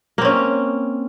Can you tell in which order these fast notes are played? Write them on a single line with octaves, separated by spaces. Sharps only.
A#3 C4 C#4